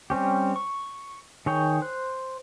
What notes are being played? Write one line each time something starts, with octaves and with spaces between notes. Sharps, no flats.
G3 C4 C#4 G4
C#6
D#3 G#4 C#5 G5
C5 F#6